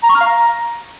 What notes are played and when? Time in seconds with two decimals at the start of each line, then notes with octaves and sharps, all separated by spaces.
0.04 A#5
0.09 C#6
0.15 F6
0.21 F5
0.27 A#5